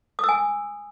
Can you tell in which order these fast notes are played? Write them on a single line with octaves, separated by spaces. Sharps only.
D#6 E6 G#5